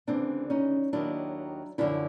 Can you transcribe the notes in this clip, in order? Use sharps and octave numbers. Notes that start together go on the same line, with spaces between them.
D2 C#3 E3 C4 D4
C#4 D#4
D#2 D#3 F#3 D4 E4
F#2 D3 F3 D4 E4